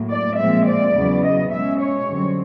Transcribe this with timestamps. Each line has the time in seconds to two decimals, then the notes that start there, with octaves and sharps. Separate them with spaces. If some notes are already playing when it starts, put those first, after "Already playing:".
Already playing: A2 F#3 A#3
0.10 D5
0.37 A#2 F3 G#3 C4 E5
0.66 D5
0.94 E2 C#3 F#3 B3
1.23 D#5
1.51 B2 G#3 C#4 E5
1.80 C#5
2.07 F#2 D3 G3 C4